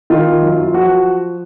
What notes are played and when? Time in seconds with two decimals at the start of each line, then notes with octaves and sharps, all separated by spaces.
0.10 D#3 F4
0.42 F#2
0.64 F4
0.74 F3 F#4